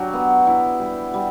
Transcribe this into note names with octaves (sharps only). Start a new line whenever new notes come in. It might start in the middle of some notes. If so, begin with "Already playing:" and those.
Already playing: F#3 D4 G4
B3
E4
G3
G3